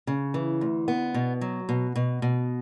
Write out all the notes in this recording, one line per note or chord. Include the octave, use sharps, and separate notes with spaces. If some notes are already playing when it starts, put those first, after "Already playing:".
C#3
E3
D2
B3
B2
F#3
B2
B2
B2